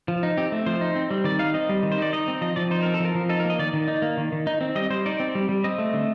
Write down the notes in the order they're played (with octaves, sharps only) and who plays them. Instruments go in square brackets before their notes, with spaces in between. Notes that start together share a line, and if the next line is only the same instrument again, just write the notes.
[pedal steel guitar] F3
D#4
C4 G4
A3
F3 C5
D#4
C4
G3
D#3 D5
D#4 F5
C4 D#5
G3
D#3
C5
D#4 D5
D#4 D#5
C4
F3 D#5
F3 D5
D#4 C5
C4 A#4
A4
F3 A#4
F3
D#4 A4
A#4
A#3
D#5
D#3 D5
D#3
D#4
A#3
D#3
D#3
D#4
C4
G3 D#5
G3 C5
D#4 D5
C4
G3
G3
C4 D#5
A3
D3